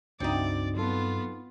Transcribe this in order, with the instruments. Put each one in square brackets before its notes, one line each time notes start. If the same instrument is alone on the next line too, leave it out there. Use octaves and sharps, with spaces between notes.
[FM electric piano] C#2 D4 F#4 [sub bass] G2 [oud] C4 D#4 [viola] D5
[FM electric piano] F#3 A4 [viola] B3 F4